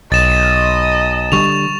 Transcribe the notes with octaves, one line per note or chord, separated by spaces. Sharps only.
B1 D#5 A6 E7
D3 G3 C#6 F7